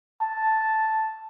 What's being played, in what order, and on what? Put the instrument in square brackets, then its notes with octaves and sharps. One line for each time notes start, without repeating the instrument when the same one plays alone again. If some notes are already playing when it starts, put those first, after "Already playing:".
[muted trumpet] A5